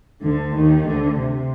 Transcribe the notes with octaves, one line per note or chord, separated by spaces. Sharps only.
D2 D3
D#2 D#3
D2 D3
C3